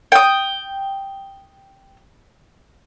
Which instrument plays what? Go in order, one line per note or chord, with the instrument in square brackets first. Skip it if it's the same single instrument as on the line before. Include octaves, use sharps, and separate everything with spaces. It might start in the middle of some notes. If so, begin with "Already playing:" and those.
[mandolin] G5 D#6